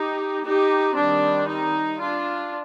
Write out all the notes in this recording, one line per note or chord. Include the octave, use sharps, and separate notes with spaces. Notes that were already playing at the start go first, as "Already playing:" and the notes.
Already playing: D#4 G4
D#4 G4
D#3 G3 C4 D4
D#4
D4 F4